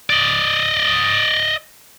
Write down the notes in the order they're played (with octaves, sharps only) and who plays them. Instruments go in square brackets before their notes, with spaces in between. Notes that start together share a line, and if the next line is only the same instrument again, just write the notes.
[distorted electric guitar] D5 D#5